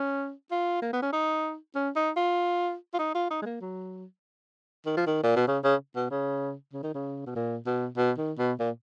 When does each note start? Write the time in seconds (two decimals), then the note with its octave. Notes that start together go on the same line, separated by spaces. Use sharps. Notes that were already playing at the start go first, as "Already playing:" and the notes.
Already playing: C#4
0.51 F4
0.82 A#3
0.93 B3
1.02 C#4
1.13 D#4
1.75 C#4
1.96 D#4
2.17 F4
2.94 F4
2.99 D#4
3.15 F4
3.31 D#4
3.42 G#3
3.46 A#3
3.61 F#3
4.86 D#3
4.97 F3
5.07 D#3
5.23 A#2
5.36 B2
5.48 C#3
5.64 C#3
5.96 B2
6.11 C#3
6.73 C#3
6.83 D#3
6.94 C#3
7.26 B2
7.36 A#2
7.66 B2
7.97 B2
8.18 D#3
8.38 B2
8.60 A#2